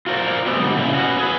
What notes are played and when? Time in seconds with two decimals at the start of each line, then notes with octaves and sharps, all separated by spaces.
0.07 F4 F#4 A#4 C5 D5
0.46 G#3 A3 B3 C4 G4
0.60 G#2 D3 G3
0.75 A#2 C#3 E4
0.93 C#4 F#4 B4
1.19 G#4 B4